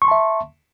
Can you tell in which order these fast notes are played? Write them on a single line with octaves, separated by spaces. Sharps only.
C#6 C6 A5 E5